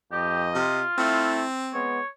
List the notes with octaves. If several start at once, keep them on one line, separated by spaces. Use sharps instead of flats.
F2 G4 D#5
C3 F4
A3 C4 E4
G#3 B3 C#5